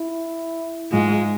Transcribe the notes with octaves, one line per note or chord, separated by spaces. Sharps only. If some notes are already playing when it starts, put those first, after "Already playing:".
Already playing: E4
G#2 G#3 F4